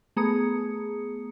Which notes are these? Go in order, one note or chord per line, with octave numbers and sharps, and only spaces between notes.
A3 B3 G#4 A#5 D#6 C#7